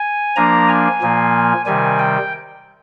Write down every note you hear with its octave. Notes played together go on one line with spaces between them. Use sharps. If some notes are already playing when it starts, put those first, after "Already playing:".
Already playing: G#5
F3 A#3 D4 A#5
G#5
A#2 F3 A#3
C3 D#3 G3 G#5
G5